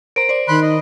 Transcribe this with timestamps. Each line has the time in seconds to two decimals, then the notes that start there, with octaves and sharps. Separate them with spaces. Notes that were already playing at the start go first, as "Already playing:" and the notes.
0.16 A#4 C5 A#5 D7
0.29 C5 D5
0.48 D#3 B5 C6 F#6
0.62 D#5